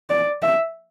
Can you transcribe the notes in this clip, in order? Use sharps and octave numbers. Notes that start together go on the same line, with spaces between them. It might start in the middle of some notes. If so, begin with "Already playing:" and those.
D5
E5